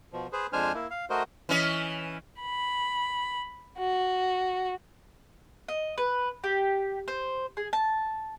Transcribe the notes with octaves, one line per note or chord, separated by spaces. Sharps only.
B2 F3
G#4 B4 C5
F2 G#3 D4 C5 G#5 F6
A#3 E4
F5
A3 F#4 A#4 C5 D#5
E3 C#4 D#5
B5
F#4
D#5
B4
G4
C5
G#4
A5